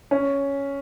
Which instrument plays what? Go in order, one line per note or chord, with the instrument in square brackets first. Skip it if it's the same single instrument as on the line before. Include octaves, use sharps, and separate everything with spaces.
[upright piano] C#4